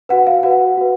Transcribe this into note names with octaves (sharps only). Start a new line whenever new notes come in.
F#4 B4 F#5
F5
F#4 B4 F#5
F#4 B4